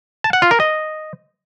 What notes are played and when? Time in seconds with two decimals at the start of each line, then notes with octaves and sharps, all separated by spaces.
0.24 A5
0.33 F#5
0.42 F4
0.51 A#4
0.60 D#5